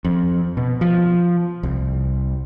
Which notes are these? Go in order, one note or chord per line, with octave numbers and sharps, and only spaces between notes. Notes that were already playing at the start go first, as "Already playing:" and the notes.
F2
B2
F3
C2